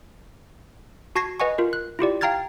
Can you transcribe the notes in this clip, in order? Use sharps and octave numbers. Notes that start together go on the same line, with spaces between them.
F#4 A5 C#6 G#6 A#6 C7
B4 D#5 F#5 G#5 C#6
F4 A#4
F#6
E4 F4 G4 D5
F5 G5 A#5 F6 G#6 A6